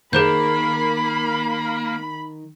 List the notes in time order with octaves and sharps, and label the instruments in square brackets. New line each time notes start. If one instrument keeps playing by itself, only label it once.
[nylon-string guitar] D#3 [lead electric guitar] A#3 [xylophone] G#4 C5 G6 [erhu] B5